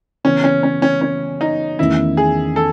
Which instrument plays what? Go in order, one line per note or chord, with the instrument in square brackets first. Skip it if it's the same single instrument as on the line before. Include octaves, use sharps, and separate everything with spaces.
[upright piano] C#3 E3 B3 [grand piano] C#4
[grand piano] C#4
C#4
C#4
C#4
D#4
[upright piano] E2 D#3 A3 C#4 [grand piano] E4
[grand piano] G#4
A4